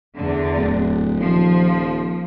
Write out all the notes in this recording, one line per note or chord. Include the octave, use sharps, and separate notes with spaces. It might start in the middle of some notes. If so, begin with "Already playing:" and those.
E2 D3
D1
D#1 F3